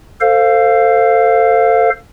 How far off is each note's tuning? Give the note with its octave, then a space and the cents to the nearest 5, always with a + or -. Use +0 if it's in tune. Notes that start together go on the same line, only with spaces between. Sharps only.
A4 +25 C5 +0 F5 +0